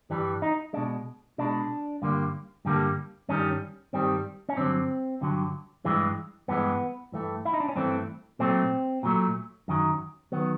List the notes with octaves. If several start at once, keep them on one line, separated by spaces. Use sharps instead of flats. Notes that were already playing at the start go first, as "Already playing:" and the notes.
G2 E3 G3
D#4
B2 G#3 D4
B2 G#3 D4
G2 D3 G3 A#3
G2 D3 G3 A#3
G2 D#3 G3 C#4
G2 D#3 G3 C4
C#4
G2 D3 F#3 C4
G2 D3 F#3
G2 E3 G#3
G2 E3 G#3 B3
G2 E3 A3
E4
D#4
D4
C#4
G2 E3 A3 C4
A#2 F#3 A3 C4
A#2 F#3 A3
F#2 D#3 F#3
D#3 F#3 B3